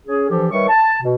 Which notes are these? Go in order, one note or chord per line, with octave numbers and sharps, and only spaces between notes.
C#4 G#4
D3 E3 F3 G4 A4
D#3 G3 B4 C#5 E5 C#6
A5
B2